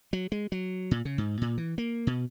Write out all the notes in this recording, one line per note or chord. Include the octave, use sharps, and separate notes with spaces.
F#3
G#3
F#3
A#2
C#3
G#2
A#2
E3
A#3
B2